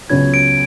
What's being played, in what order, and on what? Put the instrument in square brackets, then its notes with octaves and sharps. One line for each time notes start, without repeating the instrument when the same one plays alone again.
[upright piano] C#2 C#3 F#3 B3 [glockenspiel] G#6
[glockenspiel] D7